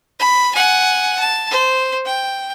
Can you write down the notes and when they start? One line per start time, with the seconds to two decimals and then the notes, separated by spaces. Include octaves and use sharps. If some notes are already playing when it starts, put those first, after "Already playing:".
0.20 B5
0.55 F#5 G#5
1.20 A5
1.51 C5
2.06 G5